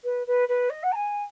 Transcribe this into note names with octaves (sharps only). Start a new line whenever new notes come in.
B4
B4
B4
D#5
F#5
A#5
G#5